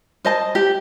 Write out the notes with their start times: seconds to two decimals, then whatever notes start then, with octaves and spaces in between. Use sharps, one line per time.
0.25 C5 D#5 A5
0.55 G4